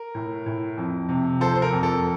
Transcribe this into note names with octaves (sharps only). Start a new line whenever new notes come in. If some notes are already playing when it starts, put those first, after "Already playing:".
Already playing: A#4
A2
A2
F2
C3
F3 A4 C5
C5
A#4
F2
A4